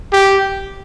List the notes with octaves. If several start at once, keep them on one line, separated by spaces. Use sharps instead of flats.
G4